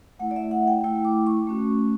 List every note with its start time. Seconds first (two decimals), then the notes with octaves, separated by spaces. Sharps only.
0.19 A3 E4 F#5
0.31 D5
0.36 E5
0.51 F#5
0.68 G5
0.84 A3 E4 G5
1.05 D6
1.27 C#6
1.47 A3 C#4 F#4